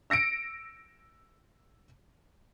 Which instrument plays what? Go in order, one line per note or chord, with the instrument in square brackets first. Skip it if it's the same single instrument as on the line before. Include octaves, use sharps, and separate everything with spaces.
[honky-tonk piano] E6 A#6 C#7 D7